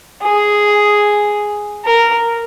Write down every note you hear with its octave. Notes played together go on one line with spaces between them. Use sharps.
G#4
A#4